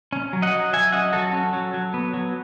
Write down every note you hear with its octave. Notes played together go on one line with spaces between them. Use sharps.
C#4
F#3
D#5 F#5
F#3
F#3 E5 G#5
C#4 D#5 F#5
F#3 F#4 A4
C#4
F#3
F#3
B3
F#3